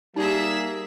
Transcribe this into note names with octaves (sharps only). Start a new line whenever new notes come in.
G3 A#3 D#4 G#4 E5